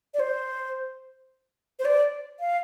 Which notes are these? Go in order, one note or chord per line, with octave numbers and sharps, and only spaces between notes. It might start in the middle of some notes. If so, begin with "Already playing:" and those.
D5
C5
C5
D5
F5